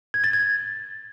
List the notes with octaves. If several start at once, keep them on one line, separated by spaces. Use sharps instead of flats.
G#6
A6
G#6